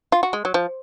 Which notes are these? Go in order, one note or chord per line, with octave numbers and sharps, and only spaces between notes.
F4
F#4
G#3
F#3
F3